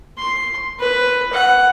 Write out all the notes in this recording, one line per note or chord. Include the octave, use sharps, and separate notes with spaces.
C6
B4
F#5